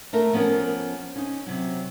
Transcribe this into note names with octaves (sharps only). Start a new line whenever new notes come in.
A3 A4 A#4 E5
F3 B3 C#4 A4 A#4
C#4 D#4
C3 F#3